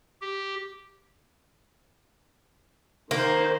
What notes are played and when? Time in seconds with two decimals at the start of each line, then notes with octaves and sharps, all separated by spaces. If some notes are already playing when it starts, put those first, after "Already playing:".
0.21 G4
3.11 D#3 A#3 C5